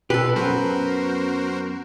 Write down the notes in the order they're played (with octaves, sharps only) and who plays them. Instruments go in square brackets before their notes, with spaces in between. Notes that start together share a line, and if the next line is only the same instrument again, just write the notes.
[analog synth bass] B2 [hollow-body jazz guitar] G4 A4 [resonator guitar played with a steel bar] B4 [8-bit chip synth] C7
[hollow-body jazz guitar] F#2 [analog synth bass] B3 [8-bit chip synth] F#4 A#4 C5